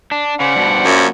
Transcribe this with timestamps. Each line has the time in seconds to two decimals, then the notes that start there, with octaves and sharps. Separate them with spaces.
0.11 D4
0.40 C#3 C5 D5 F#5
0.56 G2 B2
0.85 F#2 F3 A#3